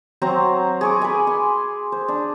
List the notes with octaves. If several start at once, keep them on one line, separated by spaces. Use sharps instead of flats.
F#3 C4 C5 A#5
G#4 C#6 D6
B4 G#5
C6
C5
D4